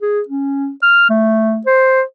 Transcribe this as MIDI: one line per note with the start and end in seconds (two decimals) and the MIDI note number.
0.02 0.21 68
0.28 0.69 61
0.83 1.07 89
1.10 1.60 57
1.66 2.02 72